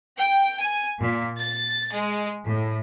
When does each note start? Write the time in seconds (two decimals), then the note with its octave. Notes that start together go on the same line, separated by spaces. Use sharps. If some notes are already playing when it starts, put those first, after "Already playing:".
0.18 G5
0.60 G#5
1.00 A#2
1.37 A6
1.92 G#3
2.45 A2